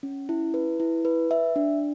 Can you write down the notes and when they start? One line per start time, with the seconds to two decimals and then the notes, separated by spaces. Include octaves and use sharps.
0.03 C#4
0.29 E4
0.54 B4
0.80 E4
1.05 B4
1.31 E5
1.56 D4